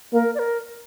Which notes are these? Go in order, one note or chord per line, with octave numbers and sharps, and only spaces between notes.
A#3 A#4
D5
A#4